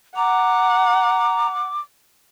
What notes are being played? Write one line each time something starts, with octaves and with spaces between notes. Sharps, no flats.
F#5 A#5 D6